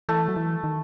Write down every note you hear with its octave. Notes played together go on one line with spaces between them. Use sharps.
E3 A3
F#3
E3
D#3